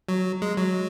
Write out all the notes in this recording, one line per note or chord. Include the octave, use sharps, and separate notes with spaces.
F#3
G#3
F#3